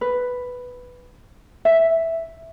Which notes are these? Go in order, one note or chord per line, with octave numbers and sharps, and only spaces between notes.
B4
E5